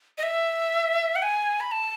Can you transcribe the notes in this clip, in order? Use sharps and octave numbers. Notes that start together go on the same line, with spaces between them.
D#5
E5
F#5
G#5
B5
A5